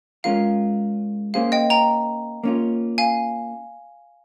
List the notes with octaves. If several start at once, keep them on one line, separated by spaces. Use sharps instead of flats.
G#3 C#4 F4 A#4 F5
A#3 C#4 G#4 C5 F5
D#5 G5
G5 A#5
A#3 C#4 F4
F5 G#5